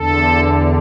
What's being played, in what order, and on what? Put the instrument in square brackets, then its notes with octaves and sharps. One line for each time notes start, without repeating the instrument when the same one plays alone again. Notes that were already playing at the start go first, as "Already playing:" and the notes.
Already playing: [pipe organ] E2 D3 A4